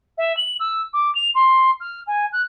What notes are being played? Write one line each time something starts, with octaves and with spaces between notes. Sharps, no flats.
E5
F#7
E6
D6
F7
C6
F6
G#5
F#6